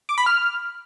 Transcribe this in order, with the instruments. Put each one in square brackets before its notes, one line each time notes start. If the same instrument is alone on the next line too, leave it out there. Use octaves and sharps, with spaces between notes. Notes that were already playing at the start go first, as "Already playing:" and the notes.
[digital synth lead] D6
B5
F6